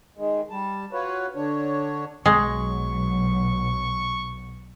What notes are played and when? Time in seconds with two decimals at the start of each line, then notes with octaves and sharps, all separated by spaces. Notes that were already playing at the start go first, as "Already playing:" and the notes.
0.17 D#3 G#3
0.50 G3 A5
0.93 F4 F#4 B4 C#5
1.35 D3 D4 C#5
2.26 B1 F#3 G#3 C#6